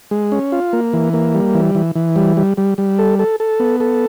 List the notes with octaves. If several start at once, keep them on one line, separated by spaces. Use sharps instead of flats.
G#3
C#4
F4
A#3
E3
A#3
G3
E3
E3
E3
G3
G3
G3
G3
A4
A4
A4
B3
A4